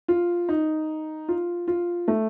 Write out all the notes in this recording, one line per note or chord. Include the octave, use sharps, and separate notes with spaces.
F4
D#4
F4
F4
A3